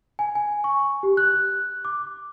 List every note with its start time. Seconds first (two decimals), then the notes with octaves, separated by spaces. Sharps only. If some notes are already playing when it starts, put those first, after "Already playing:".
0.19 G#5
0.35 G#5
0.64 C#6
1.03 G4
1.17 F#6
1.85 D6